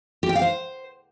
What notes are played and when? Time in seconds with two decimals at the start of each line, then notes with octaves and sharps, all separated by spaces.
0.23 G4
0.29 G5
0.35 F5
0.42 C5